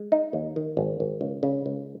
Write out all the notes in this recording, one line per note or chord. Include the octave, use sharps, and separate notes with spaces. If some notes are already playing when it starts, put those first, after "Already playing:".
Already playing: G#3
D#4
D#2
D#3
G#1
G#1
C#2
C#3
C#2